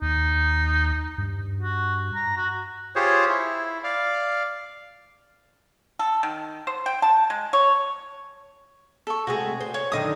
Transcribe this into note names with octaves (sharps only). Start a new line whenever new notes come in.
D#2 D#4
G2
F#4
A#5
F#4
F4 G4 G#4 C5 C#5
E4
D5 F5
A4
D#3
C5
G5
A5
G#3
C#5
A4 C#6
C3 G#3 A3 F#4 G#4
C5
C#5
F#2 D3 D#3 D#5 D#6